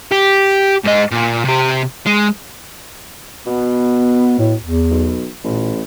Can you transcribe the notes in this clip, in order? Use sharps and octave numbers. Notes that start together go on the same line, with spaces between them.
G4
G#2 D#5
A#2
C3 G4
G#3
B2 B3
A2
E2
B1
A1 A#2